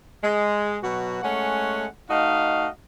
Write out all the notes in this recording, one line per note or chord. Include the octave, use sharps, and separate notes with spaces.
G#3
B2 F#3 F#4
G#3 A3 C#4 F#5
A3 D#4 F#4 D#5 F5